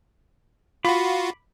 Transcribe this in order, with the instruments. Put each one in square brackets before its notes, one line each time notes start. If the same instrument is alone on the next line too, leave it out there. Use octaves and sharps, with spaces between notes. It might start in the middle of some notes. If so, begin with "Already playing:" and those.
[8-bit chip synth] F4 F#4 [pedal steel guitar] B5 D6